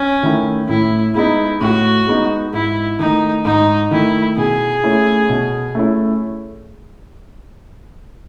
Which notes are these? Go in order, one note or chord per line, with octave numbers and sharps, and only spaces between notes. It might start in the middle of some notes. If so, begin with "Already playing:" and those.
Already playing: C#4
D#3 A3 E4
A2 E4
G#3 B3 D#4 E4
A2 F#4
G#3 B3 D#4
G#2 E4
D#3 A3 D#4
G#2 D#4
D#3 A3 E4
B2 G#4
A3 C#4 E4
B2
A3 C#4 E4